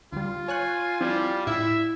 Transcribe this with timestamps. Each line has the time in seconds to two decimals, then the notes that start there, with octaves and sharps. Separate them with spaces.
0.12 D2 G3 F4
0.48 C#5 G#5 C#6 F#6
1.00 F3 G3 C4 E4
1.47 A2 E4 E5